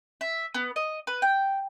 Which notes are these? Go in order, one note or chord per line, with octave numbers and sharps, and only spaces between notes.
E5
B3
D#5
B4
G5